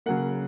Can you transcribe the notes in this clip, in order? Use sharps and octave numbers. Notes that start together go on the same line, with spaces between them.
C#3 F#3 A#3 F#5